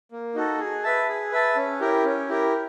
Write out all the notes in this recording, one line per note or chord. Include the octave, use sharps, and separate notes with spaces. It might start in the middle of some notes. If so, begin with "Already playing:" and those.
A#3
D#4 F#4 A4
G#4
B4 E5 A5
G#4
B4 E5 A5
C#4
E4 G4 A#4
C#4
E4 G4 A#4